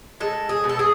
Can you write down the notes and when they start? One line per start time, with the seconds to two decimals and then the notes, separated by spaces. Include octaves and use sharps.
0.20 G#3 A4
0.49 G#4
0.64 B2
0.69 A4
0.79 G#4